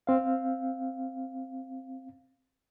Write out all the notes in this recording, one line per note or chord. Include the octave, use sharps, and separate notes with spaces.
C4 F5